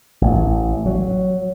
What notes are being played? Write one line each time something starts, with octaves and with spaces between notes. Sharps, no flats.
A1
F#3